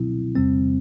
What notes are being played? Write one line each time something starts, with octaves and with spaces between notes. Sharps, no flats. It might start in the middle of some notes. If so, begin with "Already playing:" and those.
Already playing: B2 F#3 C4 E4
E2 C3 G3 C4